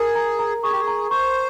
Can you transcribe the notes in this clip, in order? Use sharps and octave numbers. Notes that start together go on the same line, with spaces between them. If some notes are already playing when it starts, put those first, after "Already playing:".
Already playing: G#4 A#4 A#5
A#5
A#5
G#4 C#6
G4
G#4
A#5
C5 C#6